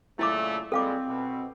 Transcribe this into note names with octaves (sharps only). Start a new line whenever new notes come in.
A#2 C#3 A3 E4 D#5 D6
A#2 G3 G#3 C4 A4 F5 D6
B2